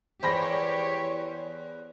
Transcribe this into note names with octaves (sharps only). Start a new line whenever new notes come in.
E2 G4 C5 C#5 B5 A#6